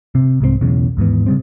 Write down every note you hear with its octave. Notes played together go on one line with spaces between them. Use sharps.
C3 C4
C2 G#2 G3 C4
E1 B1 E2 C#3
D#2 G#2 E3 B3
C#3 G3 C4